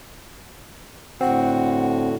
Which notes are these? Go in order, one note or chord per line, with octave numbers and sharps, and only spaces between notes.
A2 D3 C4 F#4 F#5